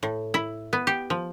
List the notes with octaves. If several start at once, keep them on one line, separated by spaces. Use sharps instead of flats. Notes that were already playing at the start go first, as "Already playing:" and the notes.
A2
E4
B3
G4
F3